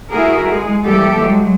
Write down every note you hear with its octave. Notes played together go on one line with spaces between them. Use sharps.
A3 E4 F#4 G#4 A#4
G#3 G#4
E3 G3 A#3 G4 A4
F#3 G#3